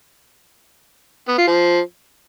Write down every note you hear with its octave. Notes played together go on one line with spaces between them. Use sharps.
B3
F4
F3